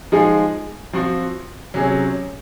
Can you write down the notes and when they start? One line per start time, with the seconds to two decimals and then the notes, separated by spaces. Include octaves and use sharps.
0.12 F3 G#3 D#4 G#4
0.93 F3 C4 F#4
1.74 C3 F#3 C#4 G#4